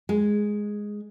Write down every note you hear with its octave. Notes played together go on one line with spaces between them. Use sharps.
G#3